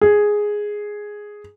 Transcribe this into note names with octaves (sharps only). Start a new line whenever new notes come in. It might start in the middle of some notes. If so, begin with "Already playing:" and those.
G#4